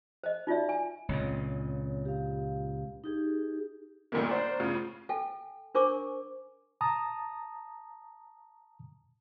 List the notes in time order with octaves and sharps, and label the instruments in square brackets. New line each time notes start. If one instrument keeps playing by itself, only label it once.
[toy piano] C5 D#5
D#4 F4 F#4 D5 E5
G#5
[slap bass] C#2 A#2 C#3 [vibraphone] C4 C#5
[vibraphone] G4 F5
D#4 G4 G#4
[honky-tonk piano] D2 A#2 D#3 G3 A3 A#3
D4 A#4 C5
A2 C#3 F4
[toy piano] A4 G5 G#5
D4 A#4 C5 G#5 C#6 D6
[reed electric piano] A5 A#5 D#6